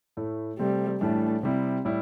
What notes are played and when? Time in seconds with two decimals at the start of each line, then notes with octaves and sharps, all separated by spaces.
0.17 A2 A3 E4
0.59 C3 G3 A3 C4
1.00 A2 E3 G3 A3 D4
1.42 C3 G3 C4 E4
1.85 A2 G3 E4